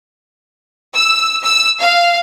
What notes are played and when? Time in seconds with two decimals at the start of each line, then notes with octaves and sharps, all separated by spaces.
0.95 E6
1.44 E6
1.80 F5